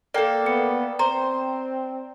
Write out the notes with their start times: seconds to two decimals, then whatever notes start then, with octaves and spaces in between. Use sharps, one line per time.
0.14 A#3 A4 D5 G5
0.46 B3 C#7
0.99 C4 C5 A#5